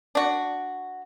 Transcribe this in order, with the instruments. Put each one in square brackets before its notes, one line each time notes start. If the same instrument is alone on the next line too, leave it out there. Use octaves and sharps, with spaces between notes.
[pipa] D4 F#4